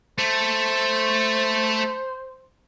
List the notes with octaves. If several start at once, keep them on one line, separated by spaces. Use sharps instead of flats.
A3 C5